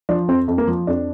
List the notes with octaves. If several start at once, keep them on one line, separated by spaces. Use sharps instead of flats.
F3 D4
F2 C4
F2
A#3
F3
F2 D4